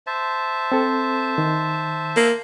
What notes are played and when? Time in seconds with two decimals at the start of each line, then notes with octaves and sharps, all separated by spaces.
0.07 C5 E5 A5
0.72 C4 A4
1.38 D#3
2.17 A#3